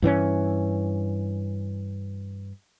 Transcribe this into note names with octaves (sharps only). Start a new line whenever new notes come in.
G2 E3 C4 C#4